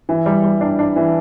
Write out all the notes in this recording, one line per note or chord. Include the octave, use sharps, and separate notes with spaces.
E3
G3
G3
D4
D4
E3